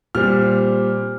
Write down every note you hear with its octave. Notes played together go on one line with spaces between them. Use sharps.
A#2 G3 C4 F6